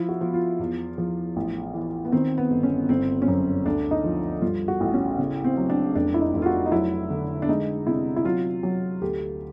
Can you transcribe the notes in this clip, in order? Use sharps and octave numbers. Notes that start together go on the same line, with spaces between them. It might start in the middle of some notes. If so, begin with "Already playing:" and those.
Already playing: F3 E4
F#4
F3
F4
E2
F3
A1
E3
B3
D#3 C4
B3
G1
C#4
G1 C4
C#4
F#2 C4
D2 D4
D#4
F3
G2 F4
F#4
A1
C#4
C#3
C4
F#3
D4
F1 D4
E4
D#4
F1
F4
F#4
D#4
F#3 E4
D3
D4
G#3 D#4
C3 E4
E4
F#3 F4
F#3
D2 G4